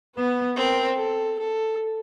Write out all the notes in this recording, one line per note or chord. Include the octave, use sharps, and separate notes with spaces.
B3 B4
C4 A#4
A4
A4